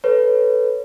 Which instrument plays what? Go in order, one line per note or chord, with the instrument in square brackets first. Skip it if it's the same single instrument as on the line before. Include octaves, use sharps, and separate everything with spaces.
[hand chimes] A4 B4 C#5